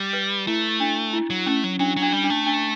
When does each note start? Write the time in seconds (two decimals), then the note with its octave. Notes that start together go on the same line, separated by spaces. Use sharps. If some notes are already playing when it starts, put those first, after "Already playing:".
Already playing: G3
0.13 B4
0.47 A3 E4
0.80 D4
1.13 E4
1.30 F#3
1.46 A3 C#4
1.64 F#3
1.79 F#3 D4
1.96 F#3
2.02 D4
2.13 G3
2.24 D4
2.30 A3
2.46 D4